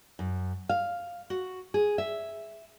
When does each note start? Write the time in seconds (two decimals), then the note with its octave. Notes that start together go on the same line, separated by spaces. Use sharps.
0.19 F#2
0.69 F5
1.30 F#4
1.74 G#4
1.98 E5